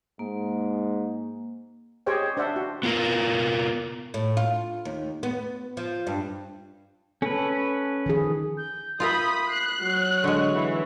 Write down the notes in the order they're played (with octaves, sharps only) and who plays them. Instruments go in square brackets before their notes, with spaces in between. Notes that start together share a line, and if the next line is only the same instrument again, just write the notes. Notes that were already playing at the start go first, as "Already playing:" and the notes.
[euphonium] G#2 [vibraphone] A#3
[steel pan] G4 G#4 C5 C#5 D#5 G5
D4 C5 D5 E5 F#5
F#4
[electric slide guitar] B3 F4 A#4
[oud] A2
F4
D#2
B3
F3
G2
[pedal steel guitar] C#4 B4 [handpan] A4
[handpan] D#3 F3 G#4
[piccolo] G6
[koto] F4 A#4 E5 [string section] B5 D#6 [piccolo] G6
[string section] F#6 [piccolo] C7
[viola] F#3 C#5
[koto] D3 G#3 [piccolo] C#6
[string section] E3